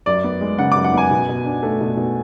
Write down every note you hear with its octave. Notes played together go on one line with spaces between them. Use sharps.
F#2 D5
B3
G#3
C#3 F#5
D6
F#2
F#5
B3 G#5
B2
B2
D4
A3
B2
B2